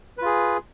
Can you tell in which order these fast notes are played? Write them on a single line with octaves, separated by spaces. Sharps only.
B4 F4 G#4